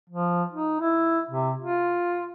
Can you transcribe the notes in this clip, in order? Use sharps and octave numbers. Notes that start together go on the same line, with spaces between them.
F3
D#4
E4
C3
F4